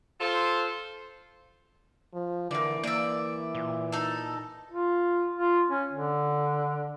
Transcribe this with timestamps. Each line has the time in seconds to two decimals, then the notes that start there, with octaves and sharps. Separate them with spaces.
0.19 F4 A4 C5
2.14 F3
2.51 D3 E3 A#3 D5
2.83 A#3 D5 E5
3.55 A#2
3.92 D#4 A4
4.71 F4
5.36 F4
5.70 C#4
5.92 D3